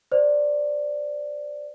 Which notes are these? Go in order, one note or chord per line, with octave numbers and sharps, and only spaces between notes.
C5 D5